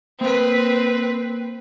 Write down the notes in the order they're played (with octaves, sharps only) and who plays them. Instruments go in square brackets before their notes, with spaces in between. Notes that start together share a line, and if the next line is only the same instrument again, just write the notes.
[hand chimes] A#3 [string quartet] C4 B4